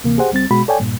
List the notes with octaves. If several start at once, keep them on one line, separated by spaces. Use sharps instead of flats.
D2 C3 E3 A#3
G4 G#4 C5 F#5
C#2 G3 C4 A6
B2 G#3 F#4 B5
A4 C#5 D5 G5 G#5
G2 A#2